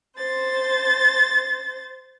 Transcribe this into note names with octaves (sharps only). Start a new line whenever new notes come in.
C5 A6